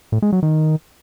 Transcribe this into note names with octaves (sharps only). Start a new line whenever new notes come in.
A2
G#3
F#3
D#3